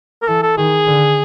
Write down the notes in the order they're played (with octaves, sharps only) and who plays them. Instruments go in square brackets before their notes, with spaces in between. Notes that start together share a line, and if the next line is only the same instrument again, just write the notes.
[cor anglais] A#4
[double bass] E3 [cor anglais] A4
[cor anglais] A4
[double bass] D#3 [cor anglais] G#4
[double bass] D3